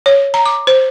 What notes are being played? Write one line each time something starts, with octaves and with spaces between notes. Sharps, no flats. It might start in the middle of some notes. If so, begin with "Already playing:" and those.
C#5
A#5
D6
C5